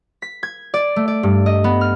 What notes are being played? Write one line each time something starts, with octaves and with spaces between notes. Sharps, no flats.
B6
G#6
D5
A3
D5
G2
D#5
B3
F6